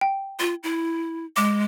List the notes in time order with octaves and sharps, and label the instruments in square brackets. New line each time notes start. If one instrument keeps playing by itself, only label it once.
[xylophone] G5
[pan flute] F4
E4
[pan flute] G#3 [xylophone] D6